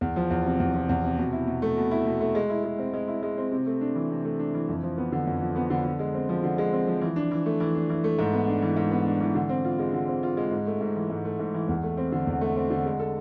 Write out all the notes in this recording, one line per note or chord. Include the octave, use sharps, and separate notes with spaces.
E2
F3
E2
C3
E2
F3
E2
C3
B2
E4
B2
A3
B2
E4
B2
A3
G#3
E4
G#3
C4
G#3
E4
G#3
C4
C3
A3
D4
E3
C3
A3
D4
E3
F2
F3
B3
D3
F2
F3
B3
D3
D3
G#3
C4
F3
D3
G#3
C4
F3
E3
D4
E3
A3
E3
D4
E3
A3
G#2
B3
D4
E3
G#2
B3
D4
E3
D3
C4
F4
G#3
D3
C4
F4
G#3
G#2
A3
G#2
E3
G#2
A3
G#2
E3
E2
A3
C4
D3
E2
A3
C4
D3
G#3
A4